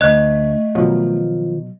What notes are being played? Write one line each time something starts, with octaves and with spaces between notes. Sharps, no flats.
D2 A3 D#5 F#6
B2 D#3 F3 F#3